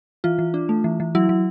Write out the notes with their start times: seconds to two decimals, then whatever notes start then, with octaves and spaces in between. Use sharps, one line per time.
0.24 E3 F4
0.39 E3
0.54 D4
0.69 A3
0.84 E3
1.00 E3
1.15 F#3 E4
1.29 F#3